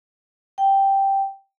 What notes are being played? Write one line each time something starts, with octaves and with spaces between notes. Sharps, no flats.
G5